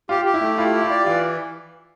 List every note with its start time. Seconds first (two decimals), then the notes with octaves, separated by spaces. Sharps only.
0.09 F4 G4
0.25 G4
0.34 E4
0.41 A3
0.58 E4 F4
0.74 G4
0.82 F4
0.90 D5
1.06 E3 F4